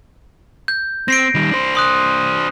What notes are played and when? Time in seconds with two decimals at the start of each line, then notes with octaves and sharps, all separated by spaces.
0.68 G6
1.08 C4 A#6 C7 D7
1.35 D#3 G3
1.51 D4 C5
1.75 C6 D#6 F#6